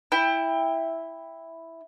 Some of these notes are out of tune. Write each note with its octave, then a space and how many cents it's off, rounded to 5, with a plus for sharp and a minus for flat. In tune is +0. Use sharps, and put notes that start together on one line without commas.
E4 +0 G5 +20